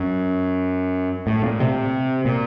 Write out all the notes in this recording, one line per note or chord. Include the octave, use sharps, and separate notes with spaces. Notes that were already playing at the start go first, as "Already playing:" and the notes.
Already playing: F#2
A2
A#2
C3
A#2